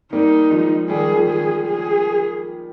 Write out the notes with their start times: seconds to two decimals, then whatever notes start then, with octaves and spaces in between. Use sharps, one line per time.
0.13 G3 A#3 D#4
0.51 F3 G#3
0.90 D#3 G3 G#4
1.16 F3
1.29 G#4
1.41 F3
1.66 G#4